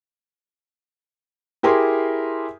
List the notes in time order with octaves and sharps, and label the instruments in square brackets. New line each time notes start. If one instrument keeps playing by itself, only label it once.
[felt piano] E4 G4 G#4 A#4 G#5 C6